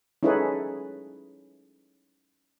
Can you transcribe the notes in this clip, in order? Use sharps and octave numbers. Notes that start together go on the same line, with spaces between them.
C#4 D#4 E4 G#4 A4 B4